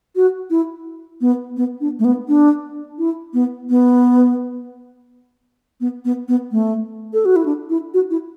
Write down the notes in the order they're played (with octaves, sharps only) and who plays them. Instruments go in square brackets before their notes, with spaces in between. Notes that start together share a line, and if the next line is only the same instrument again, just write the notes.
[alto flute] F#4
E4
B3
B3
D4
A3
B3
D4
E4
B3
B3
B3
B3
B3
A3
A4
F#4
E4
D4
E4
F#4
E4